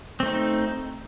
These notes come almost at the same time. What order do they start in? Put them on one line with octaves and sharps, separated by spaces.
C4 A3 D#4